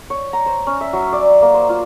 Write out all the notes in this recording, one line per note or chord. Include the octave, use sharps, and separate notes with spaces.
C#5
A#5
C5
C#4
E5
F#3
D5
A#3
C5
F4